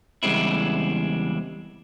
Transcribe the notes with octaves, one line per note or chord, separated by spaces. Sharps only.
E2 C#3 G3 G#3 C4 E4